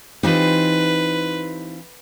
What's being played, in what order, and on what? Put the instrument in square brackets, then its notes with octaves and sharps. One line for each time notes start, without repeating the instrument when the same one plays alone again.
[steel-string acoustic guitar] E3 C4 F4 [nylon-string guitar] D#4 G4 [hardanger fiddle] B4